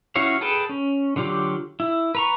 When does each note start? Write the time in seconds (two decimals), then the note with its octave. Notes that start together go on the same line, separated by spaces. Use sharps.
0.16 C#4 E4 F#4 C#5 F5
0.41 G#4 A4 B4 G5 A5
0.69 C#4
1.16 D3 F#3 F4 G4
1.80 E4
2.15 B4 A#5 C#6